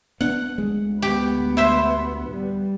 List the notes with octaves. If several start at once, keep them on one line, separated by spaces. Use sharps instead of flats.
B3 D4 F#5
D2 G#3
B3 G4
E4 C5 E5
G3